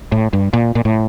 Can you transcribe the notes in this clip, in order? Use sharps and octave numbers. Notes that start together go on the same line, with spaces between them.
A2
G2
A#2
A#2
A2